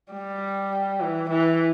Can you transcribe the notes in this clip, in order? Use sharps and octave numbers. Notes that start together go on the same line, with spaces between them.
G3
E3
E3